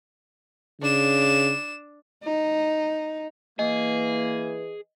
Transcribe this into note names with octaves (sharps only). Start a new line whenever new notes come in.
C#3 D4 E7
D#4
E3 A#3 G#4 B4 D#5